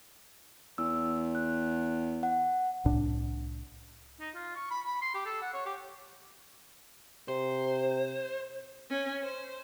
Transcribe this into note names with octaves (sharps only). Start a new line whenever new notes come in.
E2 E6
F#6
F#5
C2 A2 D4
D#4
F4
C#6
B5
B5
C6
G4
A4
F#5
C#5
G4
C3 C5
C#4
C5